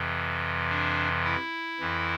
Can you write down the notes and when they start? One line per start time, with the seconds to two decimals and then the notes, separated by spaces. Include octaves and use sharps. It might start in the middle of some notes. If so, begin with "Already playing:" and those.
Already playing: F2 C3 E3
0.69 D4
1.24 E4
1.80 F2 E3